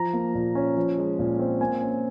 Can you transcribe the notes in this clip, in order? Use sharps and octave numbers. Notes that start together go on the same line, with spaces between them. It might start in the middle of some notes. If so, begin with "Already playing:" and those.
Already playing: F3 A#5
A#3
A#2
C#4
F3
G#3
A#2
C4
A#3 G#5
C#4